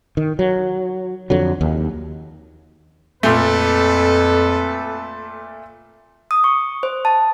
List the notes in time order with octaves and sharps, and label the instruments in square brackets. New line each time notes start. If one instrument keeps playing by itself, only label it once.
[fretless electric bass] D#3
F#3
F2 D3 F#3
D#2
[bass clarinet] F2 [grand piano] A#2 A3 [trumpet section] A4 B4
[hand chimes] D#6
C#6
C5
A5